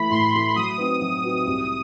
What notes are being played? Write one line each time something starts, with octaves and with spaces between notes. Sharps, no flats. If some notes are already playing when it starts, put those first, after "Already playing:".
Already playing: E3 A3 B5
A2 C6
E3 A3
F#3 D#6
C4 D#4 F#4 B4
F#3
C4 D#4 F#4 B4
C2